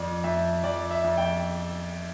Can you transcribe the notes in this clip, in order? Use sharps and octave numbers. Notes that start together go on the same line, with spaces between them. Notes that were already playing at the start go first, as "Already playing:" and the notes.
Already playing: F2 D5
F2 E5
F2 D5
E5
F2
G5